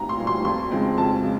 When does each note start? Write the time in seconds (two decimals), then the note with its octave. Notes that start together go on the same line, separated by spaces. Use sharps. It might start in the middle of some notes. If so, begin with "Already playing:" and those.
Already playing: C2 A#2 G3 A#5
0.09 C6
0.18 A#2 G3
0.27 C6
0.45 F2 C6
0.71 C#3 F3 G#3 C4
0.98 F2 A5
1.23 C#3 F3 G#3